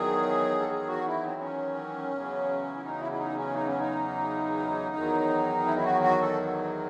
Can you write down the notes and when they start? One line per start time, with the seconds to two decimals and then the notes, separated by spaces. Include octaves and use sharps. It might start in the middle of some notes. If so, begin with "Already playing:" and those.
Already playing: E2 D#3 F#3 G#4
0.60 A4
0.69 G#4
0.88 F#4
1.06 E4
1.23 C4
1.41 C#4
2.11 E2 C#3 F#3
2.77 E4
2.83 D#4
3.00 E4
3.12 E4
3.17 D#4
3.36 C#4
3.54 D#4
3.66 C#4
3.79 D#4
4.96 E2 D#3 F#3
5.66 E4
5.77 E4
5.84 F#4
6.02 F#4
6.20 A4